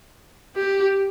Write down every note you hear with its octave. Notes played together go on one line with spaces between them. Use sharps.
G4